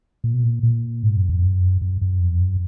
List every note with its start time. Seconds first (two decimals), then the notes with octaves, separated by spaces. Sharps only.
0.24 A#2
0.34 B2
0.44 A#2
0.63 A#2
1.03 G#2
1.16 F#2
1.29 F2
1.42 F#2
1.82 F#2
2.02 F#2
2.21 F2
2.41 F#2